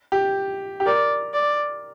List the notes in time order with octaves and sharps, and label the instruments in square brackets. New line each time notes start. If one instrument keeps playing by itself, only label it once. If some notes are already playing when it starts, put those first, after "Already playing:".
[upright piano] G4
G4
[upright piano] A#4 [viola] D5
[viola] D5